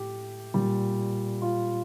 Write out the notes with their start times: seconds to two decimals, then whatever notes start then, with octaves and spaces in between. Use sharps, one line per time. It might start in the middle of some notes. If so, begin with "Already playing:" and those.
Already playing: A2 G4
0.54 A#2 G3
1.42 F4